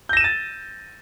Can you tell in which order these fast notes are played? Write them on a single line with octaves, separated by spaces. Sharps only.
G6 A#6 E7 D#7 A6